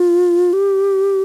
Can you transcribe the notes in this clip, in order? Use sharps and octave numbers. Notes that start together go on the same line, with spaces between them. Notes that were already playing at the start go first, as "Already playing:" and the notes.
Already playing: F4
G4